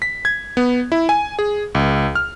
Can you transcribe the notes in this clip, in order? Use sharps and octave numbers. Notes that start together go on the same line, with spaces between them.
B6
G#6
B3
E4
G#5
G#4
C#2
F6